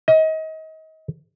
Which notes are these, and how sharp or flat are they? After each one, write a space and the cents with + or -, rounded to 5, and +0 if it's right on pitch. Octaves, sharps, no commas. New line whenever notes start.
D#5 +30